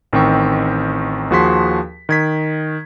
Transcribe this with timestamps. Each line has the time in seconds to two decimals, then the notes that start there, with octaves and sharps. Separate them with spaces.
0.13 A1 D#3 C4 G5 C#6
1.30 D#2 F3 F#4 G#4 C6 B6
2.09 D#3 G#6 B6